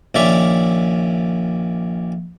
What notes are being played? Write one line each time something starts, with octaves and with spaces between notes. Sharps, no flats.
A#1 D#3 C#4 D5 E5 C#6